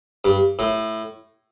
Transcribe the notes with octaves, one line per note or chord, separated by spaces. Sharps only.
G2
A2